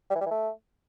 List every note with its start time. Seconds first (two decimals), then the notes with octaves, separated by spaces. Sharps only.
0.10 G3
0.15 E3
0.21 G3
0.26 E3
0.31 A3